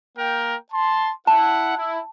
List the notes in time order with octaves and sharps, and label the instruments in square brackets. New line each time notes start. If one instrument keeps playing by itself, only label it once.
[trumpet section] A#3 A#4 G5
A5 C6
[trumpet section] E4 F#5 [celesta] A5
[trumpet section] E4